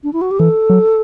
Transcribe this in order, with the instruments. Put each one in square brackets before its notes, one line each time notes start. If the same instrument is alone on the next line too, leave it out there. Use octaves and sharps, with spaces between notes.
[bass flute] D4
E4
F#4
G4
[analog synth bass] E3 [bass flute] A4
[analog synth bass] F#3